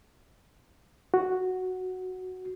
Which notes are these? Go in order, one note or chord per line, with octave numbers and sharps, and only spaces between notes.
F#4